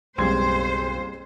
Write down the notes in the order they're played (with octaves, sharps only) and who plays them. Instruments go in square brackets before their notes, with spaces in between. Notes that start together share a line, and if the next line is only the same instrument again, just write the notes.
[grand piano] F#1 C6 G#6 [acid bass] B1 [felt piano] G3 G#3 C4 [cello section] C5